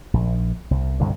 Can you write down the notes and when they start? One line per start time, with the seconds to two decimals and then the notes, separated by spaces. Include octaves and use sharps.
0.13 A#1
0.71 C2
1.00 C2 G2 B2 D3